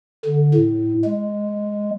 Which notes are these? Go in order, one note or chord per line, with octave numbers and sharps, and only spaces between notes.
D3
A2
G#3